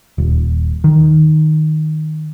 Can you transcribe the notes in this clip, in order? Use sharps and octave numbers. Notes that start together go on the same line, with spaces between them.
D#1
D#3